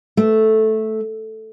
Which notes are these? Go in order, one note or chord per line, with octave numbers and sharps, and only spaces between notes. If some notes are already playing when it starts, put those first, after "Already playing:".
A3